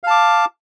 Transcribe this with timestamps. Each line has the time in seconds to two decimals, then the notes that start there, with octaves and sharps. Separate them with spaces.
0.03 F5
0.07 A5
0.10 D6